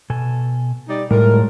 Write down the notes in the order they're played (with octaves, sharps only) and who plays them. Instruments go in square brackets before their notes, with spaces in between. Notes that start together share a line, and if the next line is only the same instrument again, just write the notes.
[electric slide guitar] B2 A4 G#5
[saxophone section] G3 D#4 D5
[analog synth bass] A2 [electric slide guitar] G3 G#3 F4 [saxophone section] A#4